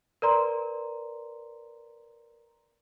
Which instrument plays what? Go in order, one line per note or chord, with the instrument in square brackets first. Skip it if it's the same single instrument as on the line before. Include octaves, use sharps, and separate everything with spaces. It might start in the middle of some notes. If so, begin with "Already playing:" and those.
[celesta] A#4 B4 D5 A#5 C6